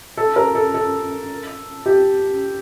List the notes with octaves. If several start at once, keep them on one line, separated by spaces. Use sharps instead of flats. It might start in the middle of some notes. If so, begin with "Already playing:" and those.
A4
A#4
A4
A4
G4